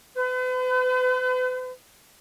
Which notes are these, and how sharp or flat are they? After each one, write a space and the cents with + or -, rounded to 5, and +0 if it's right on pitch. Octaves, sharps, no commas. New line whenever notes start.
B4 +45